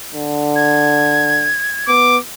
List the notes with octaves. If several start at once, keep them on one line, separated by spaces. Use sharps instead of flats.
D3
G#6
B3 D6